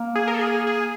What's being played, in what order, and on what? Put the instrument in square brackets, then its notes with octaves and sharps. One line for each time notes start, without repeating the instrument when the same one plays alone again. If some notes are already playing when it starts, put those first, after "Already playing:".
Already playing: [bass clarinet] A#3
[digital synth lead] G#4
A#4
A4
G#4
G#4